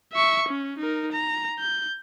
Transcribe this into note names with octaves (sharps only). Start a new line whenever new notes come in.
E5 C#6
C#4
D#4 A#4
A#5
G6